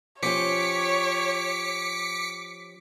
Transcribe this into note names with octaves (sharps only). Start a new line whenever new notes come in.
F3 C#4 G4 C#5 D6 B6 C#7